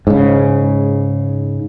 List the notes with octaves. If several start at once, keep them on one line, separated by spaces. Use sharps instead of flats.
G#2 C#3